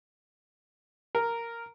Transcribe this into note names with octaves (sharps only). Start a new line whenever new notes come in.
A#4